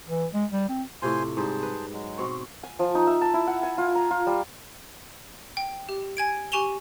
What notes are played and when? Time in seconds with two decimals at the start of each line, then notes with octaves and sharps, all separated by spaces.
0.08 E3
0.33 G#3
0.51 G3
0.69 C4
1.02 A2 C3 F4 C5 G#5 C6
1.37 G#2 G3 G#4 C5 A5
1.63 B4
1.93 F#3 G#3
2.18 B2 C4 C#5
2.63 G#5
2.79 F3
2.95 D#4
3.07 E5
3.21 A5
3.34 E4
3.47 F#5
3.63 G#5
3.78 F4
3.95 A#5
4.11 F4
4.27 G3
5.57 G5
5.89 G4
6.17 G#5 G#6 D7
6.52 G4 G#5 C#6 E7 F7 G7